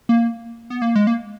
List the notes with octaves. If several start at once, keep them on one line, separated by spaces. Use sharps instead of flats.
A#3
B3
A#3
G#3
A#3